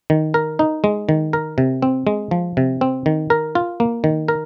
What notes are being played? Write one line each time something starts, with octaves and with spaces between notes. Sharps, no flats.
D#3
A#4
D#4
G#3
D#3
A#4
C3
C4
G#3
F3
C3
C4
D#3
A#4
F4
A#3
D#3
A#4